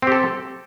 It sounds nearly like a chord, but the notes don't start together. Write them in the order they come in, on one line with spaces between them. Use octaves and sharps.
C4 G4 A4